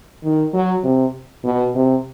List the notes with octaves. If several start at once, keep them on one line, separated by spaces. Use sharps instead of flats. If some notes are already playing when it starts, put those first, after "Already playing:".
D#3
F#3
C3
B2
C3